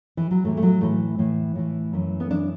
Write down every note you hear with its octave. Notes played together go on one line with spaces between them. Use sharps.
E3
F#3
A2 E3 A3
A3
F#3
A2 E3 A3
A2 E3
A2 E3
F#2 E3
B3
F#2 E3 D4